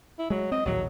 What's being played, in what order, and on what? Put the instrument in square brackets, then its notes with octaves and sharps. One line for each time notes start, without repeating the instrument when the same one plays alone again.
[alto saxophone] E4
[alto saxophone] F#3 [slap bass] G#3
[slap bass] C4 [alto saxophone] D#5
[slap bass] A#1 D#2 A2 [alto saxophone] F#3